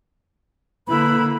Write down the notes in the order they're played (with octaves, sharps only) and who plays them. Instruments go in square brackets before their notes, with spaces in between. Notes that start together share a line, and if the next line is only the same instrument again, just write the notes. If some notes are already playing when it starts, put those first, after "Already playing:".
[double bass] D3 A#3 [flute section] E4 B4 B5